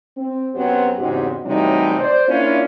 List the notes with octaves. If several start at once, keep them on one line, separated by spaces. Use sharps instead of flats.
C4
F#2 F#3 B3 C4 G4 C5
E2 G#2 C#3 C4 F#4 G4
A2 C3 E3 F#3 G3 D#4
C5 D5
A#3 C#4 D4 E4 F4